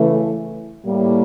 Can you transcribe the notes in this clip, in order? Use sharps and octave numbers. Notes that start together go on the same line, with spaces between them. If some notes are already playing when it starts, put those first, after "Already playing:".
Already playing: C#3 E3 A3
A2 G3 A#3